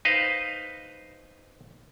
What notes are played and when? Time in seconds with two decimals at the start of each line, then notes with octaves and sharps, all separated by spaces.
0.05 D#4 B4 C5 D#5 F5